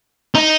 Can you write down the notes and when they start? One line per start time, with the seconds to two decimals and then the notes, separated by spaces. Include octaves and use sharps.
0.35 D#4